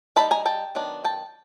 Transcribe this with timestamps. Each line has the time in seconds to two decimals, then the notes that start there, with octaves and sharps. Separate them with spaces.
0.16 G3 C4 D#4 A5 B5
0.31 G#5 A#5
0.46 G5 A5
0.75 D#3 F#3 B3 D4
1.04 G5 A5